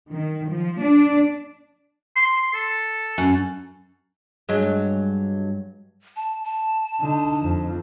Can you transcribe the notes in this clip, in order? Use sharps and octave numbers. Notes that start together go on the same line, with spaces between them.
D#3
F3
D4
C6
A4
F#2
G2 F#3 G#3
A5
A5
D3 D#4
F2